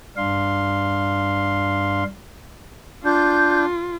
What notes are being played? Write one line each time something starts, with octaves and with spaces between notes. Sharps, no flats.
G2 D4 F5 C6
D4 F4 G6